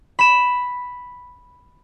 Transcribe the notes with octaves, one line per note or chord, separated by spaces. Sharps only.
B5 E7